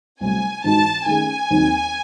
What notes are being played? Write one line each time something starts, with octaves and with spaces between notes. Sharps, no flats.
C2 C3 F#3 A3 G#5
G#2 E3 G#3 D#4 F#4 A5
D#3 A3 C#4 G#4 G#5
D#2 D#3 F#3 C4 D#4